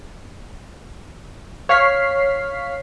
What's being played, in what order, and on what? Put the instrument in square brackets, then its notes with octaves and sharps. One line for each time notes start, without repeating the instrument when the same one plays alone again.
[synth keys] C#5 F5 C#6 F6 B6 C7